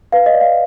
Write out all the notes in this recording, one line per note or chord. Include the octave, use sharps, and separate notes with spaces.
B4 F5
D#5
D5
F5